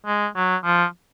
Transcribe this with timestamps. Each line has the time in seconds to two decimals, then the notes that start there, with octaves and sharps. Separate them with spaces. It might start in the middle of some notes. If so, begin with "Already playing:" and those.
0.06 G#3
0.36 F#3
0.65 F3